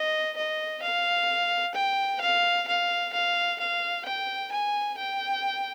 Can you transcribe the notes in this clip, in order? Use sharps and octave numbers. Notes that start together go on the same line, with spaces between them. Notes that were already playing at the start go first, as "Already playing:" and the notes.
Already playing: D#5
D#5
F5
G5
F5
F5
F5
F5
G5
G#5
G5